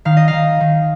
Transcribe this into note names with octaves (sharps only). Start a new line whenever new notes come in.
D#3 F5
D#5
F5
D#3
D#3